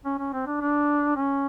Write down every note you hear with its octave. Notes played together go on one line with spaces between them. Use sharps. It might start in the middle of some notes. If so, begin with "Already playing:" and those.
C#4
C#4
C4
D4
D4
C#4